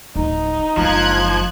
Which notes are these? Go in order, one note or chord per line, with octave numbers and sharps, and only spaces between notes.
D1 F3 D#4
F#1 F3 G#3 F4 F#6 G#6